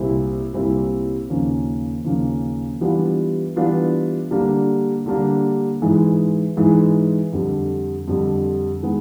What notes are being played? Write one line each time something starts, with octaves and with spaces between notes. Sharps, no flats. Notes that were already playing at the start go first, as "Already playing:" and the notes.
Already playing: C2 A#2 G3 C4 E4
C2 A#2 G3 C4 E4
D#2 C#3 F3 A#3 C#4
D#2 C#3 F3 A#3 C#4
E3 G3 B3 D4 F4
E3 G3 B3 D4 F4
D3 G3 A#3 D4
D3 G3 A#3 D4
G#2 E3 G#3
G#2 E3 G#3
F2 D3 G3
F2 D3 G3
D#3 G#3 B3